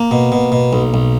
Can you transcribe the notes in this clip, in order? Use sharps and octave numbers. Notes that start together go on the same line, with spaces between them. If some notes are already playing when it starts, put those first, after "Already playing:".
Already playing: A#3
B2
B2
B2
B1
B1